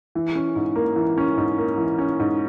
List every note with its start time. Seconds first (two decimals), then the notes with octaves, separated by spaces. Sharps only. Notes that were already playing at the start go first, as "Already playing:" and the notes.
0.15 E3
0.35 C#4
0.56 G#2
0.76 A#3
0.96 E3
1.18 C#4
1.37 G#2
1.58 A#3
1.78 E3
1.98 C#4
2.20 G#2